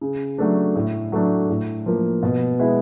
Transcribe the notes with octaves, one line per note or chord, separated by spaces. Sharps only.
C#3
F#3 A3 D4
A2
F#3 A3 D4
A2
F3 A#3
B2
G#3 B3 E4